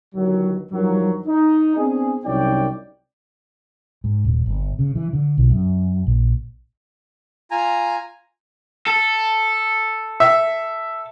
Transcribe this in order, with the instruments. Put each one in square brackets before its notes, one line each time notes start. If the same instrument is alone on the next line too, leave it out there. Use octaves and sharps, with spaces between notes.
[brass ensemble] G1 G2 D#3 F#3
G2 D#3 F3 F#3
D#4
B3 C4 D4 G#4
C2 F#2 D#4 C#5 D5 G5
[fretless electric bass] G#2
D#1
G1
C#3
E3
D3
B1
F#2
A#1
[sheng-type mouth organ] F4 G#5 A#5
[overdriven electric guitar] A4
[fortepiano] E5